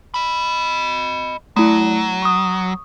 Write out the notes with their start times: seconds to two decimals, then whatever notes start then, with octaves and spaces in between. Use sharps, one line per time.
0.14 D#5 B5
1.56 F#3 A3 E4
2.22 C#6 D#6